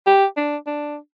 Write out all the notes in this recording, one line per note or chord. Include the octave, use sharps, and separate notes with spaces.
G4
D4
D4